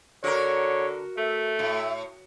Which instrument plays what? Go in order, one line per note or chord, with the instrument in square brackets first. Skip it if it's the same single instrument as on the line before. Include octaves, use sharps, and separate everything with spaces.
[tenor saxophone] D3 [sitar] F#4 A#4 [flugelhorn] C#5
[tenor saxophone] A3 [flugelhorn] E5
[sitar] A2